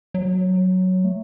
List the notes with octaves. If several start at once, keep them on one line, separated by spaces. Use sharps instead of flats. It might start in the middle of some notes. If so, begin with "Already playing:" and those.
F#3
A3